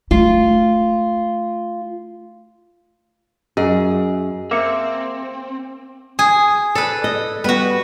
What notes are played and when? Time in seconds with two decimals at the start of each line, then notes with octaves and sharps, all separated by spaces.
0.11 A3 F4
3.57 F#2 G#4 D#5
4.51 A#3 C4 E5 D6 C#7
6.19 G#4
6.75 A4 B4 D5
7.04 D#5
7.44 G3 B3 F#4 B4